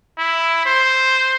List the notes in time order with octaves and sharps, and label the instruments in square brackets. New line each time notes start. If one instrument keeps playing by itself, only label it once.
[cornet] E4
C5